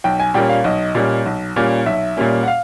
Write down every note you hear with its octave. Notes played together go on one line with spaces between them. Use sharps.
B1 G5
G#5
A#2 G3 A#3 C#4 G5
F5
B1 D#5
A#2 G3 A#3 C#4
B1
A#2 G3 A#3 C#4
B1 E5
A#2 G3 A#3 C#4
F#5
F5